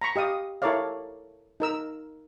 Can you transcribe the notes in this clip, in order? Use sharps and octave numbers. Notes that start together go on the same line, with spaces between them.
A#5 B5 C#6
G4 D#5 F5 D#6
E4 A4 A#4 C#5 D5 F5
D#4 A#4 E6